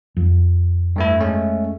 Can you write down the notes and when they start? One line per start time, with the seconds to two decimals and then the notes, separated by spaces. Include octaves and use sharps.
0.17 F2
0.96 G2 A3 E4
1.21 G#3 A3 C#4